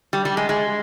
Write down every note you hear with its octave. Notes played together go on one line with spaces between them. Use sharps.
G3
G3
G#3
G#3